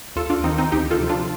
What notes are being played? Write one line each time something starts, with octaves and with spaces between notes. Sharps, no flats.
D#2 F4 A4
D4 F4
D#3 C4 D#4
C4 D#4
D2 D#4 G4
F4 A4
C3 F3
D4 F4